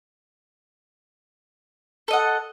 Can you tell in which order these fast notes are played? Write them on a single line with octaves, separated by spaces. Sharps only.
A4 D#5 F#5